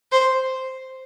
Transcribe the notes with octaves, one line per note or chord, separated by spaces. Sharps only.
C5